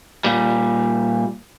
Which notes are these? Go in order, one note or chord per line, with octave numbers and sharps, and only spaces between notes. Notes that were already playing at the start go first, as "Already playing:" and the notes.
A#2 G3